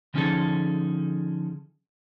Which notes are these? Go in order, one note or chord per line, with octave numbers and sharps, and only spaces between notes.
D3 F3 C#4 D#4 G#4 A4